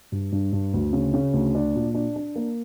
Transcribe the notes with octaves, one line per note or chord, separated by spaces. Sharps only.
G2
G2
G2
D2
C#3
C#3
D2
D4
A#2
D4
D4
A#3